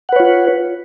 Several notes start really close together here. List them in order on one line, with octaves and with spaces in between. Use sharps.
F#5 B4 C#5 F4